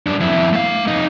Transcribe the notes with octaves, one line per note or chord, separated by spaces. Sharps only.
F#2 D4
F2 E4
A3 F5
F2 D#4